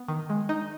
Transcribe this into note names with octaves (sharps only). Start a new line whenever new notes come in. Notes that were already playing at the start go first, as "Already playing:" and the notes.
Already playing: B3
D#3
G#3
D#4